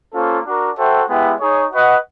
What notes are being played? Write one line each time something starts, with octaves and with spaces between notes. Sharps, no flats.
A#3 C#4 F4 A4 C5
D4 F#4 A#4
F#4 A4 C5 E5 G5
G#3 B3 E4 G4
D#4 G#4 C#5
F#4 B4 D#5 F#5